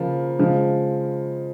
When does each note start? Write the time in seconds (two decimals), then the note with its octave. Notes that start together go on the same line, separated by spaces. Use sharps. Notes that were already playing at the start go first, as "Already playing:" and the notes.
Already playing: C#3 F3 A#3
0.39 C#3 F3 G#3